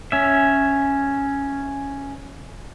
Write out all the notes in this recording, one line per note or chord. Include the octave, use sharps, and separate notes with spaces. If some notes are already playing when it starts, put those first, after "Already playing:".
C#4 E5